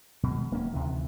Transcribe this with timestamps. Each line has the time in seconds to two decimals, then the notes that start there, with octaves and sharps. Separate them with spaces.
0.23 B2 D#3 G3 G#3
0.51 D1 A#3 C4 C#4
0.73 D2 C3 D#3 E3